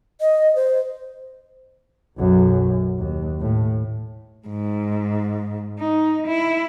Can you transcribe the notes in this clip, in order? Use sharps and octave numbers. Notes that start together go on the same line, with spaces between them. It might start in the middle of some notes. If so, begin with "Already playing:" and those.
D#5
C5
B1 F#2
D#2
A2
G#2
D#4
E4